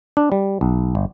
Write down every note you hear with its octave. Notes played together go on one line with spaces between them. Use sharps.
D4
G3
B1
G1